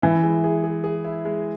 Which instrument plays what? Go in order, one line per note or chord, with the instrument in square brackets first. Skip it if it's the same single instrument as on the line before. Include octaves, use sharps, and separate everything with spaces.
[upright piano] E3 [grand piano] E4
[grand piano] G#3
G#4
G#4
G#4
E4
G#3